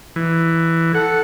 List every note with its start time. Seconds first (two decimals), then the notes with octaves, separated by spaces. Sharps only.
0.16 E3
0.95 A4 F#5